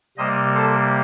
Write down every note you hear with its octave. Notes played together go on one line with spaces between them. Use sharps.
C3 G3 A#3 C5 D#5
A4 C5